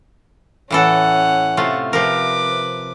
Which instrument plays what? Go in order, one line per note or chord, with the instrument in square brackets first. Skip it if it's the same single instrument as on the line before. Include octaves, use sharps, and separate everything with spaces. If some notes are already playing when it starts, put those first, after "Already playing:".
[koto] A2 E3 A4 [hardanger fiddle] C#4 F#5
[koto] C3 A3 F4
[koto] C3 F3 A#4 [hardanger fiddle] B4 D6